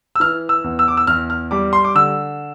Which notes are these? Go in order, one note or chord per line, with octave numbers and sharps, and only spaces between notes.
E6
E3 F6
E6
E2
E6
D6
E6
E2 F6
F6
G3 D6
C6
D6
D3 E6